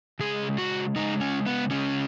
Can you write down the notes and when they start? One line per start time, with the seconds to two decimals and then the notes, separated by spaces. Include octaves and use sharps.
0.19 C#3 G#3 G#4
0.58 F#4
0.96 C#3 G#3 D#4
1.21 C#4
1.46 B3
1.71 C#3 G#3 C#4